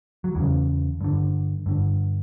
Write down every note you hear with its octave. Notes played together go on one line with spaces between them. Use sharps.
F#3
E2 C#3 E3
G2 D3
G2 D3